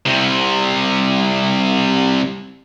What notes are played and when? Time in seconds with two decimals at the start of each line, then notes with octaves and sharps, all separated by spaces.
0.06 C2 C3